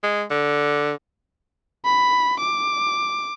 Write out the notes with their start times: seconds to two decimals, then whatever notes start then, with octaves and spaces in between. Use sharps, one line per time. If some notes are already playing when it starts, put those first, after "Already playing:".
0.04 G#3
0.30 D3
1.85 B5
2.40 D6